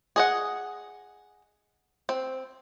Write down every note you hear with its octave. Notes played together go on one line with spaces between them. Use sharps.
G#4 D#5 F#5
C4